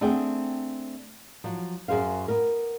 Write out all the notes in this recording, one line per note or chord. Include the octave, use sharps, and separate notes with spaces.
A3 C4 D4 G#4 F#5 G5
F3 F#3
F#2 G#4 C5 F5
B3 A#4